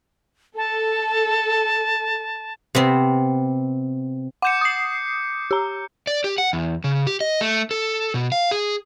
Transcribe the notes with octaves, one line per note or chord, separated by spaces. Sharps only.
A4 A5
C3 B3 C4
F#5 D6 G6 C#7 E7
D#6 C7
G4 A#5
D5
G4
F#5
E2
C#3
G4
D#5
A3
A4
B2
F5
G#4